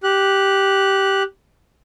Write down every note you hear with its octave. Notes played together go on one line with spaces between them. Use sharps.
G4 F#6